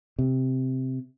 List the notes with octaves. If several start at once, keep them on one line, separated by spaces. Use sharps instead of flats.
C3